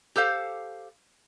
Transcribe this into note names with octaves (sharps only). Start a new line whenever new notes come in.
G4 A4 C5 F5